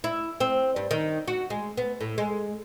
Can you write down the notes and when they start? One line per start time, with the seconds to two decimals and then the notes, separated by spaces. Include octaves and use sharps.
0.04 E4
0.40 C4
0.76 G2
0.91 D#3
1.28 F#4
1.50 G#3
1.77 B3
2.01 A2
2.18 G#3